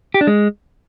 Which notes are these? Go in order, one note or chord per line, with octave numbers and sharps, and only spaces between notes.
G4
D4
G#3